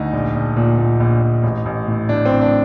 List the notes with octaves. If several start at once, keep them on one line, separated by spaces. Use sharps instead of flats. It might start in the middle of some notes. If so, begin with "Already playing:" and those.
Already playing: D2 D#4
A#1
A#1
A#2
A#2
A#1
A#1
A1
A1
A2
A2 D4
C4
A1
D4